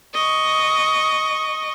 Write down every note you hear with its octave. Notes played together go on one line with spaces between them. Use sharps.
D#5 C#6